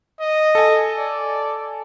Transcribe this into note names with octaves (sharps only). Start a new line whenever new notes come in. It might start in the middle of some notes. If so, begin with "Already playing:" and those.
D#5
A4 G#5
D5